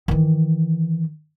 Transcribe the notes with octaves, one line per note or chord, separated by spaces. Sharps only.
D#3 E3